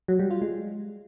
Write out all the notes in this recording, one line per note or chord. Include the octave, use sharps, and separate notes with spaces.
F#3
G3
F4
G#3